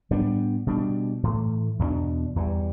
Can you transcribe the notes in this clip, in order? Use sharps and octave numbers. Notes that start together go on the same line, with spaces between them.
A2 G3 B3 D4
B2 G3 D4
A2 E3 A3
E2 B2 B3 D4
E2 E3 G3